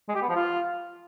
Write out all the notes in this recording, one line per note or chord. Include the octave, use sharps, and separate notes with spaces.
G#3
G4
B3
F3
F4